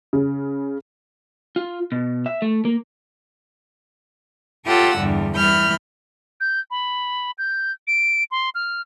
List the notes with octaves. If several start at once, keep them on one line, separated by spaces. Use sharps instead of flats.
C#3
F4
B2
E5
A3
A#3
F4 G4 A4 C#5 F#5 E6
E2 G2 D3 G3
E3 G3 B5 F6 G6
G6
B5
G6
D7
C6
F6